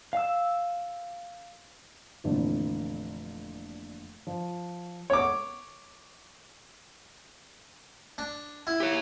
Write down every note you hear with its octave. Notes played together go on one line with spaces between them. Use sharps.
F5 E6
F1 A#2 D3 E3
F3
C#5 D6
D4
E4
G4 C#5